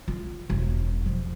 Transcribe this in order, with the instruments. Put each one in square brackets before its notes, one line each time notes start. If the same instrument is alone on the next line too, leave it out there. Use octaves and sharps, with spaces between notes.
[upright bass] F4
E1
F3